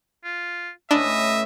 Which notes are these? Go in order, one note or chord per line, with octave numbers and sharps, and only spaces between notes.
F4
A2 C#4 D4 B4 D#5 E5